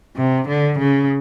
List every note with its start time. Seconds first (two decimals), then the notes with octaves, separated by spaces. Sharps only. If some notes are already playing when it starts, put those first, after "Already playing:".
0.16 C3
0.48 D3
0.79 C#3